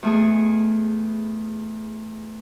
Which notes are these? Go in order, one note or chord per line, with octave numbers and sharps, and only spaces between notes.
E2 A3 G#4